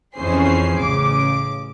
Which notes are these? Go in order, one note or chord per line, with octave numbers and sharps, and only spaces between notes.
F2 E3 C#4 G#4 C5 C7
A1 C#3 D6